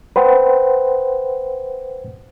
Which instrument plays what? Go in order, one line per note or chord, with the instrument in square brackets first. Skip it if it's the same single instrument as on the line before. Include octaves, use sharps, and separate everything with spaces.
[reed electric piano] B4 C5 F#5 G5